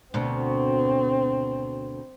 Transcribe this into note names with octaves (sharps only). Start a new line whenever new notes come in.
D2 B2 C4